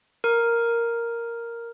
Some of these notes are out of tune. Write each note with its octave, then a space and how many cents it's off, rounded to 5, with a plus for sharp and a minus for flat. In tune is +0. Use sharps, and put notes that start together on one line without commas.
A#4 +0